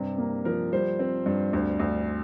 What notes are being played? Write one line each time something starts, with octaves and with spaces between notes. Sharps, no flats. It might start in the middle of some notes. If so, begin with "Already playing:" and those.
Already playing: G2 C3
A#3
F3 A#4
G3 C5
C4
G2
D2
D2